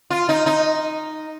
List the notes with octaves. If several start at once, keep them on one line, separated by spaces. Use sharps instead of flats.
F4
D#4
D#4